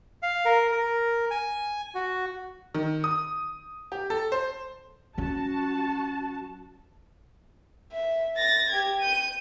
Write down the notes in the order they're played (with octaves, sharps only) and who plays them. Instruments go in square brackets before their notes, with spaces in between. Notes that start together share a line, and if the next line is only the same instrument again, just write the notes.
[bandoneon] F5
A#4
A#4
G#5
F#4
[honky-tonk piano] D#3
D#6
G4
A4
C5
[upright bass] F#3 C#4 [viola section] F#4 A5
[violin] E5
A6 A#6
G4 G#6
G6 D#7